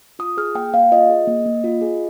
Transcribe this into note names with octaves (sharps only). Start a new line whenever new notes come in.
F4 D#6
G#4 F6
A#3 G5
A#3 F5
F4 D#5
G#4
A#3
A#3
F4
G#4